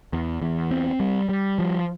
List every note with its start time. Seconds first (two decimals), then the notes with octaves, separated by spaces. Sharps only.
0.13 E2
0.42 E2
0.71 C4
1.00 G3
1.29 G3
1.59 F3